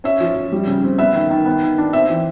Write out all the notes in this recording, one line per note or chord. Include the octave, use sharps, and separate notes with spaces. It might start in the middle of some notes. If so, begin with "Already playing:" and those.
C#4 E5
F3
F3
G3
C#3
C4
B3 E5
D#3
D#3
B3
D#3
D4
C4 E5
E3